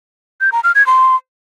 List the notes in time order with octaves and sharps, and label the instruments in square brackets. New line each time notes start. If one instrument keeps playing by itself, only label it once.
[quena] G6
A#5
F6
G#6
C6